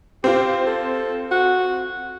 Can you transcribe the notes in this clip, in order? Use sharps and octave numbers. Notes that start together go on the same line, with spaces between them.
C4 F4 G4
A4
F#4